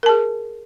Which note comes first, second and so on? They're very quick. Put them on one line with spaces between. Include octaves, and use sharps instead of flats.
A#4 A5 G#4